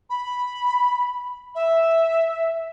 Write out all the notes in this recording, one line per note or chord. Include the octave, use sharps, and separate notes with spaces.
B5
E5